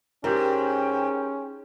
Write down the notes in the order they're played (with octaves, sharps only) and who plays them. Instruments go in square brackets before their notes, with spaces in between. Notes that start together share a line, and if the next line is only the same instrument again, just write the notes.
[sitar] G#2 [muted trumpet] C#4 [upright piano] G4 A#4 [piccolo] G5